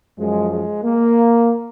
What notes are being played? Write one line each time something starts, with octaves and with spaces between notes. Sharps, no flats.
F#2 F3 G#3
G#3
A#3